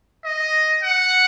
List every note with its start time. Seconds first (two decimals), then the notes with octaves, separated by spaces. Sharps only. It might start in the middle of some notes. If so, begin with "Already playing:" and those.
0.24 D#5
0.83 F#5